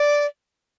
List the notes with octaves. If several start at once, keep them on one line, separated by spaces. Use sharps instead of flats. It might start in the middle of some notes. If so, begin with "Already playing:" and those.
Already playing: D5